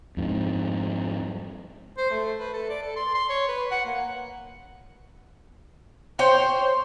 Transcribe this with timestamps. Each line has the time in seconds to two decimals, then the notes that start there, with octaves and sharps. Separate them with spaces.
0.17 F2 G#2
1.98 C5
2.11 A3
2.39 B4
2.54 A4
2.69 D5
2.82 A4
2.97 C6
3.15 C6
3.30 C#5
3.48 B4
3.71 F#5
3.86 A#3
6.19 C5 C#5 G5